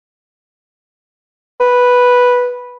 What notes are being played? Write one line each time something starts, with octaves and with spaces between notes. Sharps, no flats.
B4